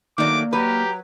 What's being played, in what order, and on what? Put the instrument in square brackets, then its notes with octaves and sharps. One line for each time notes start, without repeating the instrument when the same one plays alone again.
[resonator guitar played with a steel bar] D#3 F#3 A3 [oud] A#3 D5 [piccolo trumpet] D6
[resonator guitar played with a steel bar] F#3 B4 [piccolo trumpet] G4 [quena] A#5